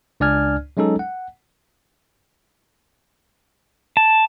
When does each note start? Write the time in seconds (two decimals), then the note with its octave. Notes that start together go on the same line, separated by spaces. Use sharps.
0.20 C#2 D4 D5 G#5 F6 G#6
0.77 F#3 G#3 C#4 D#4 A4
0.99 F#5
3.97 A5